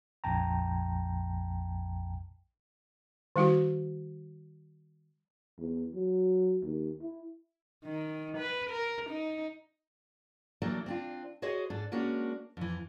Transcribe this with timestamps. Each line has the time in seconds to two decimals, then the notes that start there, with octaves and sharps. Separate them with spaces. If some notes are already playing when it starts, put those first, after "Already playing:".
0.24 A#1 F2 G5 A5 A#5
3.36 D#3 G3 E4 F#4
5.59 E2
5.95 F#3
6.63 D#2
7.02 E4
7.86 D#3
8.38 B4
8.71 A#4
9.10 D#4
10.62 E3 F#3 A3 A#3 D4
10.86 C4 D4 F4
11.42 F#4 G#4 C5 C#5 D#5
11.70 G#2 D4 A4
11.92 G#3 A#3 C#4 D4 F#4
12.57 F2 E3